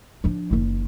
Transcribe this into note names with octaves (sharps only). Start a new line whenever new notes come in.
F3 D4
F#1 D#3